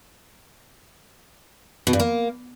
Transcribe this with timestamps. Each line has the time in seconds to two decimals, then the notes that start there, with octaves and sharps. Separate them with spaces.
1.87 B2
1.93 G2
2.00 A#3